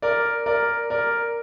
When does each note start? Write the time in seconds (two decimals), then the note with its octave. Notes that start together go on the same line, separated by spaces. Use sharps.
0.02 A#4 D5
0.46 A#4 D5
0.90 A#4 D5